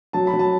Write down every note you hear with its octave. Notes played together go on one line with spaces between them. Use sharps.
F#3 A5
B5
F#3
A5